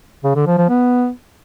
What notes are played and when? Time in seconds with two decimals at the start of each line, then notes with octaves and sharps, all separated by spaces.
0.24 C#3
0.35 D3
0.46 F3
0.58 F3
0.69 B3